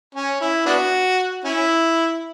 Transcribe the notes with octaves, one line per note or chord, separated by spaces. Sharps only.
C#4
E4
B3 D4 F#4
C#4 E4